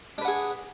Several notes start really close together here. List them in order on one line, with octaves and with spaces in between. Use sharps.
D4 B4 F#5 G#4